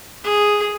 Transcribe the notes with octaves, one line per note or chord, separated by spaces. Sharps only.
G#4